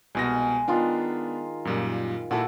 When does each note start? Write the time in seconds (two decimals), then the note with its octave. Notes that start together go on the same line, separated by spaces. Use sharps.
0.15 C2 B2 G#3 A#6
0.68 D#3 B3 D4 F4 D#5
1.65 F#2 A#2 G3
2.31 A#2 E4 F#4 A4